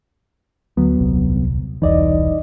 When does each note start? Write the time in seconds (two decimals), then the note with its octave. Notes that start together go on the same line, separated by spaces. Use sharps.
0.77 D2 F#3 B3
0.99 D#1 C2
1.82 E1 C2 E3 D#4 D5 D#5